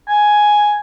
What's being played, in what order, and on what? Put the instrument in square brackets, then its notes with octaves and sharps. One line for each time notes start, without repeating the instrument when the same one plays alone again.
[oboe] G#5